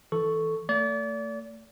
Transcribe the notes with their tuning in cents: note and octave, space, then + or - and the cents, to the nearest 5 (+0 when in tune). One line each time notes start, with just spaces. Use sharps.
E3 -20 A4 +0 C#6 +0
A3 +30 D5 -35